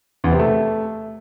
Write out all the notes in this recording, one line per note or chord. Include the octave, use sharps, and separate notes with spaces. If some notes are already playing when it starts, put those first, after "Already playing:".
E2
C3
A3